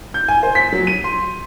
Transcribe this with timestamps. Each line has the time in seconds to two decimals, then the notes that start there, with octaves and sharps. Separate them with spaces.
0.14 G6
0.28 G#5
0.43 C5
0.55 B6
0.73 F#3
0.87 D#7
1.04 C6